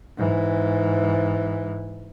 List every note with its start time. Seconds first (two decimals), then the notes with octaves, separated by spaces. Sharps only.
0.17 G#2 E3